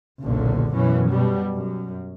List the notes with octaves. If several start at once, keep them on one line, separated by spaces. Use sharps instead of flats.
F#1 B1 A#2 D3
F#2 B2 E3 C#4
B2 G3
F#2